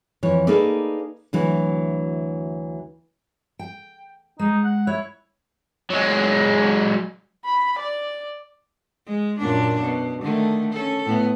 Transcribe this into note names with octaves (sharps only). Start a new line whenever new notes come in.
F2 E3 C#5
A#3 D#4 G#4 A4 B4 D5
D2 E3 F#3 F#4
G5
G#3 D#4
F#5
E4 C#5
F#3 G#3
B5
D5
G#3
F#2 A#2 D4
B2
D3 D#3 A3
C#4 A4
A2 B3